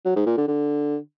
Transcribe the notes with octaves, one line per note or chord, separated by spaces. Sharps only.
F#3
G#2
A#2
D3
D3